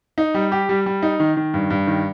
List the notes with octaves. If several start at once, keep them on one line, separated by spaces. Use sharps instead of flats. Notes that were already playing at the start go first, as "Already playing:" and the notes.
D#4
G3
G4
G3
G3
D#4
D#3
D#3
G2
G2
D#3